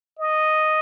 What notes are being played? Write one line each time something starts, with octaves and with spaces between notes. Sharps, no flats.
D#5